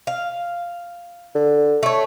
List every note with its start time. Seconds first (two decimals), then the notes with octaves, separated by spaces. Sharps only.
0.07 F5
1.35 D3
1.83 A3 C#5